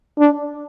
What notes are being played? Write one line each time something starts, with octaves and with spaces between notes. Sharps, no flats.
D4